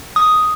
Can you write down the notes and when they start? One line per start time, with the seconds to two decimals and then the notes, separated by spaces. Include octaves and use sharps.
0.16 D#6